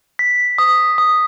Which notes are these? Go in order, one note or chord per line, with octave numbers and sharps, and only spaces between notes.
B6
D#6
D#6